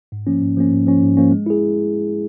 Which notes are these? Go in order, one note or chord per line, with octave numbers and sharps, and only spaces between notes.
G#2
F3 A#3 C#4
G#2
F3 A#3 C#4
G#2
F3 A#3 C#4
G#2
F3 A#3 C#4
G#3
E4 G#4